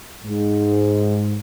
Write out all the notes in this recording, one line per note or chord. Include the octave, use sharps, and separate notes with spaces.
G#2